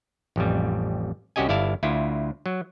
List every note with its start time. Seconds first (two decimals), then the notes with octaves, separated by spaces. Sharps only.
0.36 A1 F2 G3
1.36 C2 C#4 F#4 G4 D#5 G#5
1.49 G1 E4 D5 F5 A5
1.83 D2 E4 F4
2.46 F#3